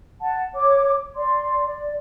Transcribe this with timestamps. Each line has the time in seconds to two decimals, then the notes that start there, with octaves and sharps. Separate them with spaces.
0.21 F#5 A5
0.55 C#5 D6
1.15 D5 C6
1.65 D5